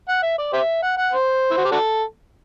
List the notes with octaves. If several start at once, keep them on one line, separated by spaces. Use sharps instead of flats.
F#5
E5
D5
G4 C5 E5
F#5
F#5
C5
E4
F#4
G4
D4 F#4 A4